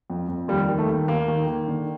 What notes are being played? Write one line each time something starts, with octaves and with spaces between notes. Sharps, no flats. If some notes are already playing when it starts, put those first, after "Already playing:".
F2
F2
D#2 G3
D#3
A3
D#2
D#2 A#3
D#3
D#3
D3